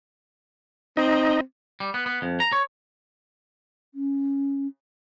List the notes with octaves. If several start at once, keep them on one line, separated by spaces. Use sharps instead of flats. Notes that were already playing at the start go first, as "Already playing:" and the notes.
C4 D#4 D#5
G3
B3
B3
F2
A#5
C#5
C#4